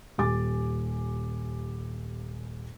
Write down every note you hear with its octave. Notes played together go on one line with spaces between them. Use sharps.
D#1 G4 G#5 D6 A6